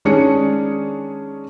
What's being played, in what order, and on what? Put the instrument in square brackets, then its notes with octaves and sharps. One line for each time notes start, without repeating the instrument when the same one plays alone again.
[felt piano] D#3 G#3 C#4 D4 G#4 C#7